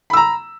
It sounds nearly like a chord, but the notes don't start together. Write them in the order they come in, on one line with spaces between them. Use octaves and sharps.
B5 E6 A#5